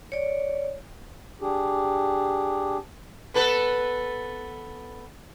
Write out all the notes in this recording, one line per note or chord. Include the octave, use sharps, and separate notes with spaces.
C#5 D5
D4 G4 G#4
B3 A4 B4